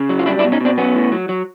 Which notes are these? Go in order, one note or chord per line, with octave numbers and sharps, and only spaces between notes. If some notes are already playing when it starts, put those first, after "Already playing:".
Already playing: C#3
F#3
F4
G3 D4 E4
D4 E4
B2
C#4 D#4
B2 C4 D4
F#3 B3 C#4
A2
F#3
F#3